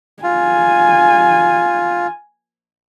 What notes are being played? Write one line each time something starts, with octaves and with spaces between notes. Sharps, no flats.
F4 G#5